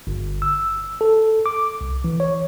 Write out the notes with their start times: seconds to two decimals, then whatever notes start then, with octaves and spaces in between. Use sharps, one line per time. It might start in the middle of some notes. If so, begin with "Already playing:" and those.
0.07 G1
0.42 E6
1.01 A4
1.46 D6
1.81 C2
2.04 E3
2.20 C#5